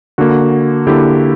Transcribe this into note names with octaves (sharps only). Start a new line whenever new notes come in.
D3 A#3 F#4
D3 A#3 E4 G4